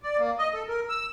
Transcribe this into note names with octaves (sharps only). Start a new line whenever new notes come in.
D5
A#3
D#5
A4
A#4
E6